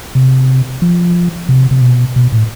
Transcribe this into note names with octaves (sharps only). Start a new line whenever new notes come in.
C3
F3
C3
C3
B2
B2
A2